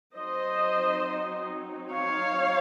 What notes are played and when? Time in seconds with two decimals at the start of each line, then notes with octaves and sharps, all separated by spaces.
0.16 F#3 C4 D#4 C5 D#5
1.94 C#5 F5